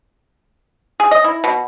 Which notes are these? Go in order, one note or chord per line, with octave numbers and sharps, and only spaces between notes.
G#4
D#5
E4
B2